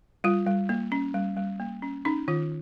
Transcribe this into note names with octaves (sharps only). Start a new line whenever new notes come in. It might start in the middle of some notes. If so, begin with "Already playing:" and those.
G3 F4
G3
A#3
C#4
G3
G3
A#3
C#4
C#4 D#4
D#3 F4